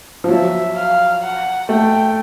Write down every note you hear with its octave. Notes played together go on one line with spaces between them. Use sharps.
F3
F#3 E5
F5
F#5
A3 G5